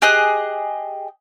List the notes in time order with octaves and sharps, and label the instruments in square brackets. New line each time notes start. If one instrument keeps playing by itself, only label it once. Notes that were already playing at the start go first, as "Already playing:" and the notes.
[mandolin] G4 G#4 D#5 F#6